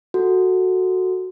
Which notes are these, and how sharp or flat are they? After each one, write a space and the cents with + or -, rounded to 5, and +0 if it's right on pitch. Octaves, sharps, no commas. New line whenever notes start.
F#4 +0 A4 +10